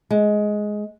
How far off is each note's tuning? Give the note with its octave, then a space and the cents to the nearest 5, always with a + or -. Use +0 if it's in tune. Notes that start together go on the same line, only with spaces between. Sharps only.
G#3 +10